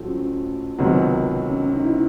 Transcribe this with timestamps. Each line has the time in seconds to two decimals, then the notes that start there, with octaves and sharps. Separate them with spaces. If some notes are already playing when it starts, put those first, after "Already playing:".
Already playing: A1 A2 F#3 A3 C4 F4 F#4
0.08 C#4
0.79 C#2 C3 D#3 F#3 B3 C4
1.50 C#4
1.76 D#4
1.85 E4